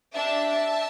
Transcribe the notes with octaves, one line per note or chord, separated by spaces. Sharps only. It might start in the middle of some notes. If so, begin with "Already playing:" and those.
D4 G4 E5 A5